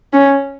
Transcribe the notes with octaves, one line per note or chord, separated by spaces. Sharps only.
C#4